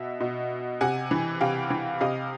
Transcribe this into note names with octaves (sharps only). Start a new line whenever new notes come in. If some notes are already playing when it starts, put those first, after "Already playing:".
Already playing: B2 E5
B2
C3 F#5 G#5
E3
C3 F5 G5
E3
C3 D#5 F5